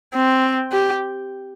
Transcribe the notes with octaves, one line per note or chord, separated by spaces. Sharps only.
C4
G4